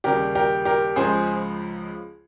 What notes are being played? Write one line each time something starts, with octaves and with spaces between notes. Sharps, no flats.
D#2 C#3 G3 G4 A#4
G4 A#4
G4 A#4
C#2 C#3 F3 G#3 G#4 C5